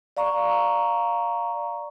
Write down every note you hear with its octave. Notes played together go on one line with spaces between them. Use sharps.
D5 F5 A#5 C#6